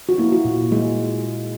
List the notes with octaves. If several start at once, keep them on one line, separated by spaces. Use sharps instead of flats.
F#4
A#3 E4
F#4
A#2
G#3